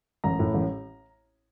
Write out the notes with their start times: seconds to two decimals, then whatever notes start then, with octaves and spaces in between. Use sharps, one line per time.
0.24 A1 A#5
0.39 A2
0.54 A1